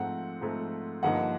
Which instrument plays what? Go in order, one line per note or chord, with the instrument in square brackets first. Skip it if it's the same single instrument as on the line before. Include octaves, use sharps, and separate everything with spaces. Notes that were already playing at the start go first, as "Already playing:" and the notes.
Already playing: [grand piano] G#2 F3 A3 C4 [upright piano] F#5
[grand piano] G#2 F3 A3 C4
[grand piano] G2 D3 F3 A#3 D#4 [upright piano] F#5